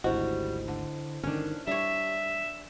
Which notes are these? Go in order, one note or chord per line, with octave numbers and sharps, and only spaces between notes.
G#1 D2 G3 E4 F#4 C5 D#5
D3
G1 D3 D#3 C#4 D4
G3 D4 C#5 E5